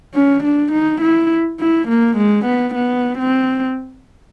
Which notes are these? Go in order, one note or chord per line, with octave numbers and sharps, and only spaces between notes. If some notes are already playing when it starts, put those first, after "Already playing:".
C#4
D4
D#4
E4
E4
A#3
G#3
B3
B3
C4